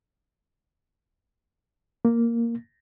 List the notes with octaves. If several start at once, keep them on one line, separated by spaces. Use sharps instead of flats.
A#3